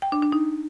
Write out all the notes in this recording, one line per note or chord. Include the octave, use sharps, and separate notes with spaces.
G5
D4
D4
D#4